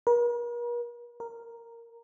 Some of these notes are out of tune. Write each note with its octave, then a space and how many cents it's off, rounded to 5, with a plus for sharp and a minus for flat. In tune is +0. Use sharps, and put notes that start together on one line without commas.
A#4 +45
A#4 -5